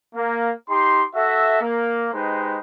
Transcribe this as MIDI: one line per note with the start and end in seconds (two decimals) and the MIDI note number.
0.15 0.51 58
0.70 1.04 63
0.70 1.04 67
0.70 1.04 84
1.15 1.59 66
1.15 1.59 69
1.15 1.59 76
1.62 2.09 58
2.13 2.59 56
2.13 2.59 63
2.13 2.59 67
2.13 2.59 71
2.13 2.59 72